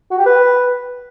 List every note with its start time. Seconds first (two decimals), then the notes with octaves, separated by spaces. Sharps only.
0.11 F#4
0.18 G4
0.26 B4